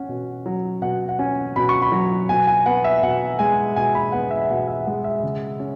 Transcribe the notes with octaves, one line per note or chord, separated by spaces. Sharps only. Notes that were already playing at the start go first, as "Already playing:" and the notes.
Already playing: C#4 F#5
B2
F#3
B2 F#5
F#5
C#4 G#5
B2 B5
C#6
B5
F#3
B2 G#5
G#5
B3 F#5
E5
B2 F#5
G#3 G#5
B2 G#5
B5
B3 F#5
E5
E5
B2 F#5
E5
G#3 F#5
E5
C#3
C#4